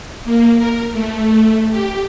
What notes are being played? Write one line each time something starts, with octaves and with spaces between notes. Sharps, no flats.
A#3
A#4
A3
G4